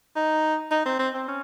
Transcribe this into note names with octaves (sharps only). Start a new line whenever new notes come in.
D#4
D#4
C4
C4
C4
C#4